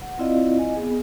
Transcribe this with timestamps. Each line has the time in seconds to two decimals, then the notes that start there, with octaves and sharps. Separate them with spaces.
0.02 F#5
0.19 C4 E4 F4 D5 D#5 F5
0.58 D#5 G#5
0.76 B3 G#4